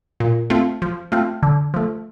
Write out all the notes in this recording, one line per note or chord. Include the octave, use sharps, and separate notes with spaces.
A#2
A3 C4 F4
F3
A3 C4 F4
D3
F3 A3